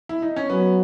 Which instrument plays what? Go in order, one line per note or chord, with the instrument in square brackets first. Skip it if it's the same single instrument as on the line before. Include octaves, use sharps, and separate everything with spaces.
[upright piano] E4
D#4
C#4
[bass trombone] F#3 [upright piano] B3